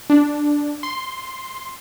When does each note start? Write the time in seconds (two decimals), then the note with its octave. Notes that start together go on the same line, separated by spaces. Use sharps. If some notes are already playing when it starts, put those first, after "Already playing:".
0.10 D4
0.83 C6